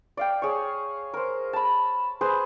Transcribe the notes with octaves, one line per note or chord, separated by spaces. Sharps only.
D5 F5 G5
G#4 C#5
A#4 C5
A5 B5
G#4 B4 C5